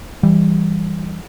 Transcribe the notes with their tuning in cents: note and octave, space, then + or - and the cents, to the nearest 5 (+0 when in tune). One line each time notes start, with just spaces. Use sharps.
E3 +0 G3 +0